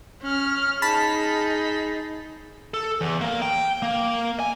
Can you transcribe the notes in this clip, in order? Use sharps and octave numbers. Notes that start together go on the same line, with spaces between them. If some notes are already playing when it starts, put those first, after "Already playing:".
C#4 F6
D#4 G#4 A5 B5 B6
A4
E2
A#3
G5
A#3
G#5